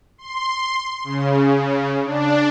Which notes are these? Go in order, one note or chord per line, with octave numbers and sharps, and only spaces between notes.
C6
C#3
D4